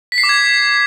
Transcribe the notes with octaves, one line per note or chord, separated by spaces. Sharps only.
B6
C7
D6
G#6